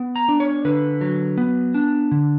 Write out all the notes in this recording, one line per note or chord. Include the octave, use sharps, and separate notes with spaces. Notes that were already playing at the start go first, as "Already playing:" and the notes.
Already playing: B3
A#5
D4
C#5
D3 B4
F#3
B3
D4
D3